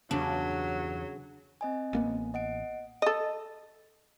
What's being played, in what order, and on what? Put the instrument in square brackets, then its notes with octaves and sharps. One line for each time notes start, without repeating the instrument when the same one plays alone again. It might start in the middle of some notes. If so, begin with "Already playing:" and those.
[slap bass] E2 G2 B3 [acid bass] C#3 [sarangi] F#3 [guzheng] D4
[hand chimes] C4 D#5 G#5
[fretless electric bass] A1 A#3 B3
[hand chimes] D#5 F#5 D7
[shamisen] A4 D#5